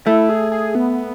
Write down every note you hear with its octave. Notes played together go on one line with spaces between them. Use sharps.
A3 E4
G#4
G#4
B3